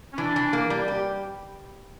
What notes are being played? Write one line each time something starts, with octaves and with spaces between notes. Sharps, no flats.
C#4
E3 D4
E3
A#3
G3
G4